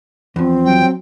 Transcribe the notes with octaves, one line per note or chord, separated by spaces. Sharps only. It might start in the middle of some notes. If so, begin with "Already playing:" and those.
E2 F3 C4
F#3 G5